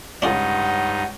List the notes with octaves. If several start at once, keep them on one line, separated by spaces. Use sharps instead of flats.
C#2 G2 D4 D#4 F4 G#4 F#5